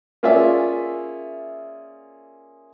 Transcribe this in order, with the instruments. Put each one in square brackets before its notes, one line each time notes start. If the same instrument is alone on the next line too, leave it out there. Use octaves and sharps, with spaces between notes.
[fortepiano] A#3 C#4 F4 G#4 D5 E5